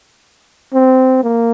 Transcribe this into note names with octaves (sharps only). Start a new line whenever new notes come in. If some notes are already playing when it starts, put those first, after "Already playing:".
C4
A#3